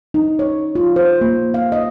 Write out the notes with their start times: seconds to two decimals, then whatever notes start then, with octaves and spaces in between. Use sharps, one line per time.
0.14 D#4
0.39 C#5
0.75 F4
0.96 C5
1.21 A#3
1.54 F5
1.72 D#5